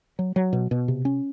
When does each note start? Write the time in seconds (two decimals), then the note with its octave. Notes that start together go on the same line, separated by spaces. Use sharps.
0.19 F#3
0.36 F#3
0.53 B2
0.71 B2
0.88 C3
1.05 C#4